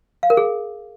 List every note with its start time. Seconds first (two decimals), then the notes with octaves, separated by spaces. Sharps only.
0.23 F5
0.30 A#4
0.37 G#4